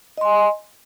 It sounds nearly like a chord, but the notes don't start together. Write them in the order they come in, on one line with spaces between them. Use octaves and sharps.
D#5 C6 G#5